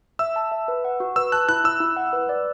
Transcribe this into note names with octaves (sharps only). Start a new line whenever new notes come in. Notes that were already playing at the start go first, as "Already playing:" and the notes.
E5 E6
A5
E5
B4
F#5
F#4
B4 E6
A5 F#6
E4 F#6
E4 E6
E4
F#5
B4
D5